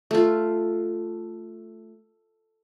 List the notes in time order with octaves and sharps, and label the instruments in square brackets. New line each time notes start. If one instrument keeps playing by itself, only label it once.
[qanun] A3 F4